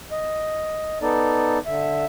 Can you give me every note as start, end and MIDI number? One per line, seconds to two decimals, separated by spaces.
0.12 0.98 75
1.02 1.58 59
1.02 1.58 63
1.02 1.58 69
1.02 1.58 74
1.66 2.05 50
1.66 2.05 76